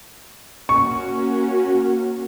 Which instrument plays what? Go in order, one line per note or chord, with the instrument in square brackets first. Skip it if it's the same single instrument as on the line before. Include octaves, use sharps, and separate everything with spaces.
[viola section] A#3 C#4 F#4 [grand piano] C#6